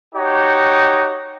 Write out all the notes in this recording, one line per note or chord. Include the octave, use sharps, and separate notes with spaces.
D#4 F#4 G4 C#5